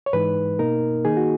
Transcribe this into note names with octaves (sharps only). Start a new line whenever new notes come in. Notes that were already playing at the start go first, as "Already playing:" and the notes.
C#5
G#2 E3 G#3 D#4 B4
B2 A#3 D#4 A#4
D#3 A#3 D#4 G#4
F#4